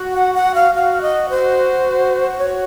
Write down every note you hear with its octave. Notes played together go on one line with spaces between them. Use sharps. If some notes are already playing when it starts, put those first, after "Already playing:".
Already playing: F#4
F#5
F#5
F5
F#4 F5
D#5
C5
C#5